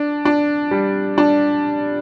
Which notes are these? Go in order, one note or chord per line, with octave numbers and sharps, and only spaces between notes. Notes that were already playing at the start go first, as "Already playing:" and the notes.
Already playing: D4
D4
G3
D4